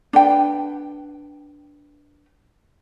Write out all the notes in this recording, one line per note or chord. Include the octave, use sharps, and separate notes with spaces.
D4 B4 G5